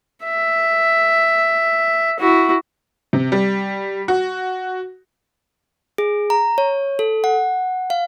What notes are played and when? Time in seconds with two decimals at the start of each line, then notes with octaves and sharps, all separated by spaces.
0.24 E5
2.20 E4 F#4
3.13 C3
3.32 G3
4.08 F#4
5.98 G#4
6.30 A#5
6.58 C#5
6.99 A4
7.24 F#5
7.90 F5